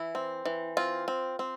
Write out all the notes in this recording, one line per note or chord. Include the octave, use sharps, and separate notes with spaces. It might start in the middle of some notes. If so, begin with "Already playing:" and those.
Already playing: E3 E4
C4
E3
C4 F4
C4
C4